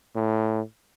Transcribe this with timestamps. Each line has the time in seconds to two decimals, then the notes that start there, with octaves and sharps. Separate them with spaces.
0.15 A2